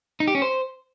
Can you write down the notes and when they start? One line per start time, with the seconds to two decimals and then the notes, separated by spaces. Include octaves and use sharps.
0.20 D#4
0.28 G4
0.35 C#4
0.42 C5